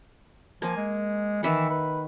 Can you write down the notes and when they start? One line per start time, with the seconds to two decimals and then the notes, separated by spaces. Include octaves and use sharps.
0.62 F3 A#3 G#5
0.77 G#3
1.43 D#3 E3 E5 F#5
1.70 B4